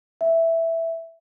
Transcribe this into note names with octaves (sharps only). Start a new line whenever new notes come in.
E5